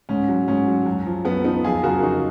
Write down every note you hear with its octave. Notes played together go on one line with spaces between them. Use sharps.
G#2 C#4
F#3
G#2 C#4
F#3
F#2
F3
F#2 B3
F3 B3 D#4
F2 F4 G#4
C#3 F#3 F#4 A#4
F2 D#4 F#4